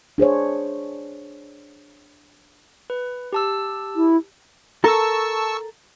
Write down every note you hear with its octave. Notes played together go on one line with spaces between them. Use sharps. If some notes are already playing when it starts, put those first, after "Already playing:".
D4 G#4 C5 C#5
B4
G4 A5 E6
E4
A4 A#4 A5 C#6 E6